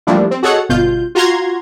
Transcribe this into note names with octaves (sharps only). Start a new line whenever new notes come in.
F3 G3 A3 A#3 D4 E4
C4
F#4 G#4 A4 C#5 D#5 F#5
G1 B2 F4 G6
F4 F#4 A#5 C6 G#6